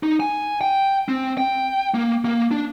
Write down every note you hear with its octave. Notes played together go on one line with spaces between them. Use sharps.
D#4
G#5
G5
C4
G5
A#3
A#3
D4